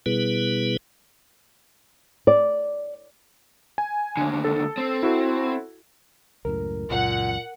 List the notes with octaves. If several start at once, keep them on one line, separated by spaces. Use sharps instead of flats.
B2 G3 B3 E4 G#4 B4
D5
G#5
D#2 D3
A4
C4
E4 F#4 A4
C#2 F#2 A2 A#4
C#2 F#2 A#2 F#5